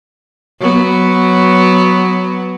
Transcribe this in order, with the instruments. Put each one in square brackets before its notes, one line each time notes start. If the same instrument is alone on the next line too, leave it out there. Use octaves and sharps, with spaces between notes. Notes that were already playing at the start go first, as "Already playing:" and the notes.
[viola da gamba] F#3 B3